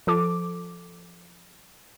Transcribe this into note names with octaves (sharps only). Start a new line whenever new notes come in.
F3 A4 D6